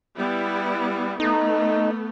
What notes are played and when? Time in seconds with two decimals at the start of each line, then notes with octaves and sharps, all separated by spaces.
0.17 G3 B3 E4
1.20 A3 B3 D#4